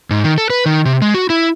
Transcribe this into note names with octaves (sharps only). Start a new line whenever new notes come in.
G#2
D#3
A4
B4
D#3
C3
G#3
F#4
E4